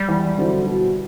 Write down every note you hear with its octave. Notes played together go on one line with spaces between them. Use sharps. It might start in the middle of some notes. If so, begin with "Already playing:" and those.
Already playing: G3
E2
D3 F#3 C4 E4
B2